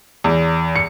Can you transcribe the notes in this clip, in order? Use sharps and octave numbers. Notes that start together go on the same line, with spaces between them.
E2
C#7